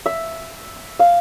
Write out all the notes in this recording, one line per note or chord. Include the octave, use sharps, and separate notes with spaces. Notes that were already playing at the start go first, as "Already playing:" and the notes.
E5
F5